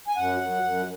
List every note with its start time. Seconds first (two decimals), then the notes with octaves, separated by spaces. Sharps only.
0.08 G#5
0.17 F#2 F#5
0.40 F#2
0.63 F#2